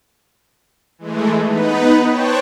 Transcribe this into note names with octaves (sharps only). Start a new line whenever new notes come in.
E3 G#3 A3
B3 D#4 B4
C5 C#5 G5 A5 C#6 F#6